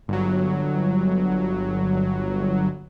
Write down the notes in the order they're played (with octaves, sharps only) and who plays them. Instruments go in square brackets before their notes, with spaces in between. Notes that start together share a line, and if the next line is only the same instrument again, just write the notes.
[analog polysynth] G1 F#3